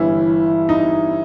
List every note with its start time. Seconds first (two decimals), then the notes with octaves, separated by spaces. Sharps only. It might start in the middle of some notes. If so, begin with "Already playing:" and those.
Already playing: G1 G2 E3 E4
0.69 D#4